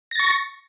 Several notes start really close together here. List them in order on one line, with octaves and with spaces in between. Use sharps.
A#6 A6 C#6